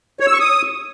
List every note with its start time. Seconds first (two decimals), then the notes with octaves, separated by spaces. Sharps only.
0.20 C#5
0.27 E6
0.33 C#6
0.40 D#6